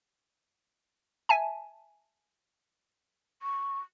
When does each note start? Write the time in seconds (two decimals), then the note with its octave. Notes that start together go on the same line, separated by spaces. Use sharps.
1.29 E5 G#5 A5
3.42 C#6